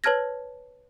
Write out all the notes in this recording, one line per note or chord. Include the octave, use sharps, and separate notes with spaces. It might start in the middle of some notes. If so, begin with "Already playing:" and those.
B4 C#5 A5 F6 G#6 A#6